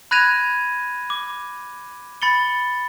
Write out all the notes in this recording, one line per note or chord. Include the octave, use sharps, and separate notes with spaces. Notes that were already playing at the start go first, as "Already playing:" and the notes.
B5 F#6 G#6 A#6 D#7 F7
D6
B5 A6 C#7 G7